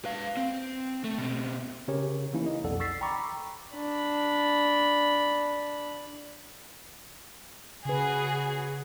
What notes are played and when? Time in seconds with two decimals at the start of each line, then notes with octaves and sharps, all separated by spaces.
0.05 B4 F5
0.37 C4
1.04 A3
1.18 B2 C4
1.88 C#3 C#4 G4 A#4 C#5
2.33 E3 A#3 C#4 D#4 E4
2.46 D#4 D#5
2.64 B1 F2 A4 D5 F#5
2.80 C#6 E6 A6 B6 C7
3.01 G5 A#5 B5 C#6 D6
3.74 D4 B5
7.85 C#3 F#4 G#4 B4